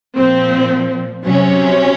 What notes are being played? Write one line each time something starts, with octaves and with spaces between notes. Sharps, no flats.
A#2 F3 C4
C3 F#3 C#4